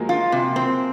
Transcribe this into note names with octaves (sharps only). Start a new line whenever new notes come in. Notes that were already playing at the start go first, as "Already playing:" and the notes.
Already playing: F3 F#3 G#3 A#3
F4
C3
C4